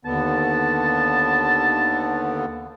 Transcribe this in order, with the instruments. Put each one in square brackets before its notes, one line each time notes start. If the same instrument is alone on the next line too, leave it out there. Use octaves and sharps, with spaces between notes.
[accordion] D#2 D3 B3 [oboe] A5